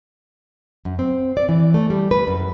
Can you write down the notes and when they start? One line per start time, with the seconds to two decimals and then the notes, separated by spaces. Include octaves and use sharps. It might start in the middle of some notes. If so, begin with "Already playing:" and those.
0.85 F#2
0.99 C4
1.37 D5
1.49 E3
1.74 A3
1.90 G3
2.11 B4
2.27 F#2